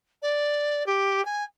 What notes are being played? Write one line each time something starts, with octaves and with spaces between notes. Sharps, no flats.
D5
G4
G#5